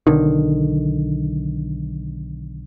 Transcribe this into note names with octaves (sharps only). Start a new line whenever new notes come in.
B1 D3 D#3